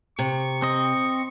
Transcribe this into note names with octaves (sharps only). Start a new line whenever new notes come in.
C3 C#6
C4 D#5